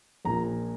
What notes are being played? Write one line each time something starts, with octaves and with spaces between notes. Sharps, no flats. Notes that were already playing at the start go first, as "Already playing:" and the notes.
A#1 A#2 F3 A#5